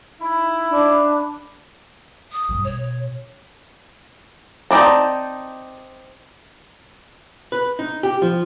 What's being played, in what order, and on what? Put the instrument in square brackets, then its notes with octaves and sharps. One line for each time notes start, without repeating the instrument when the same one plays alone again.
[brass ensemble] D#4 E4 [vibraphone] B5
[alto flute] D4
[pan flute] D#6
[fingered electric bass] B1 G2 G3
[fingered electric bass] B2 [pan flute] C#5
[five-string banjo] C4 D#4 G#4 D5 A5
[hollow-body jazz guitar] B4
D#4
G4
F3